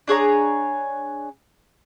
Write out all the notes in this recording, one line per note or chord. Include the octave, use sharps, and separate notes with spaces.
D4 G#4 C#5 A#5